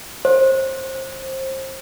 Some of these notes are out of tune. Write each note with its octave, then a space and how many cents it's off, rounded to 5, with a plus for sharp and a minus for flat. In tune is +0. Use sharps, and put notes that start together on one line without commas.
C5 +25